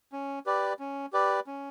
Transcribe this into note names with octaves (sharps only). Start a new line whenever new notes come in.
C#4
G4 B4 D5
C#4
G4 B4 D5
C#4